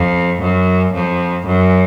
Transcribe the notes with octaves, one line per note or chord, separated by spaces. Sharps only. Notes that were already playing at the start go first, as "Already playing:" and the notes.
Already playing: F2
F#2
F2
F#2